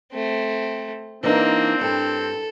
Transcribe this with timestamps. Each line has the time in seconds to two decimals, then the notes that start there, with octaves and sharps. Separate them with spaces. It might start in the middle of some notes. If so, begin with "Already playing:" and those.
0.13 A3 C4
1.23 E3 A#3 C4 D4 D#4
1.81 G2 A4